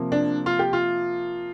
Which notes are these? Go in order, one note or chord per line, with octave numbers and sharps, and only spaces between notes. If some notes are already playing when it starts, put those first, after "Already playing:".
Already playing: C3 F3 A#3
D4
F4
G4
F4